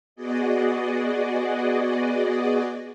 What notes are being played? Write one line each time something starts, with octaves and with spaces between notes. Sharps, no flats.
B3 F#4 G#4 D5 D#5